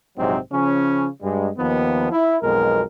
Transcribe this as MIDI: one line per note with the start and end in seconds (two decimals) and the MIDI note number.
0.18 0.39 34
0.18 0.39 44
0.18 0.39 48
0.18 0.39 54
0.18 0.39 60
0.52 1.08 49
0.52 1.08 53
0.52 1.08 61
1.22 1.50 43
1.22 1.50 56
1.58 2.10 39
1.58 2.10 51
1.58 2.10 53
1.58 2.10 59
2.12 2.38 64
2.42 2.83 35
2.42 2.83 41
2.42 2.83 47
2.42 2.83 56
2.42 2.83 70